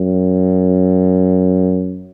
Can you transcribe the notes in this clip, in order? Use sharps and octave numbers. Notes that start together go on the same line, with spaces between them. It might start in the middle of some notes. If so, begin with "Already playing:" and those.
Already playing: F#2